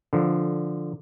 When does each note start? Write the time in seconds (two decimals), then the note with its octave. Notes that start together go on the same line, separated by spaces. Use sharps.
0.13 D3 F3